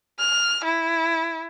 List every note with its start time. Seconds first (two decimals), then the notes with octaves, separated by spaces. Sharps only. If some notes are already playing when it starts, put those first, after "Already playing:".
0.19 F6
0.64 E4